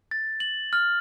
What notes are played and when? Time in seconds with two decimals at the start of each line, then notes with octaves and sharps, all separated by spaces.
0.11 A6
0.40 F#7
0.73 F6